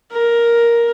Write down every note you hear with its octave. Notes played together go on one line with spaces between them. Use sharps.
A#4